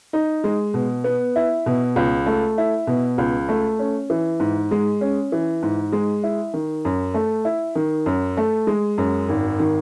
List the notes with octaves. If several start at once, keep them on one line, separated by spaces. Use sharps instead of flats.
D#4
G#3
B2
B3
E4
B2
C#2
A3
E4
B2
C#2
A3
C#4
E3
G#2
G#3
C#4
E3
G#2
G#3
E4
D#3
F#2
A3
E4
D#3
F#2
A3
G#3
F#2
G#1
D#3